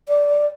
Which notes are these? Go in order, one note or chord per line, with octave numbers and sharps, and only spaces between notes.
D5